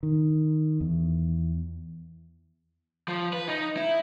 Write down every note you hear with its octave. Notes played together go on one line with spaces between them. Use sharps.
D#3
E2
F3
B4
D#4
E4